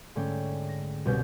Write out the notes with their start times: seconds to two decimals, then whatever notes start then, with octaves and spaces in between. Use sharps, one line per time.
0.15 G#2 D3 A3 C#4 G5
0.69 A#6
1.05 C2 B2 C#4 G6